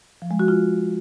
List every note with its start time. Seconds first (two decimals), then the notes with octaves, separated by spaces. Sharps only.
0.22 F3
0.31 G#3
0.39 F#4
0.48 F4